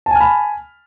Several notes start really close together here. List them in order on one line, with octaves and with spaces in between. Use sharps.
A5 G#5 F6 B5